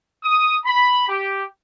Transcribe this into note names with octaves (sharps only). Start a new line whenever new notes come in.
D#6
B5
G4